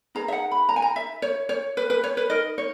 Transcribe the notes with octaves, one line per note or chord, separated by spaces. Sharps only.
D#4 G#4 B4 A#5
E5
F#5
B5
A#5
G#5
A#5
E5
C#5
C#5
B4
B4
C#5
B4
D#4 A#4 D#5
C#5